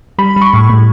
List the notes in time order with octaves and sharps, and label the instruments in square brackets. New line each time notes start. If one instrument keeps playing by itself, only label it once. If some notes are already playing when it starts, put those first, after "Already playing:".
[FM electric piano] G3 B5
G3
C#6
A2
A2